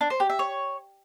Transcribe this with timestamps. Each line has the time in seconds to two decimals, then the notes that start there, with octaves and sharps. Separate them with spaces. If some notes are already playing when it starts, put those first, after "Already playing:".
0.01 D4
0.10 C5
0.20 G4
0.30 E5
0.39 C#5